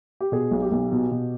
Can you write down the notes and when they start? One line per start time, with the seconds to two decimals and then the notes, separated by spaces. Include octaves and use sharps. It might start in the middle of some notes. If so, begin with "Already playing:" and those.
0.21 G4
0.32 B2 G#4
0.51 B1
0.62 G4
0.72 B1
0.92 B2
1.11 B2